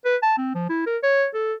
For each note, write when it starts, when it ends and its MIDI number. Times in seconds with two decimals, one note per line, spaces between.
0.05 0.16 71
0.23 0.34 81
0.38 0.52 60
0.55 0.69 53
0.69 0.83 64
0.86 0.97 70
1.03 1.26 73
1.34 1.54 69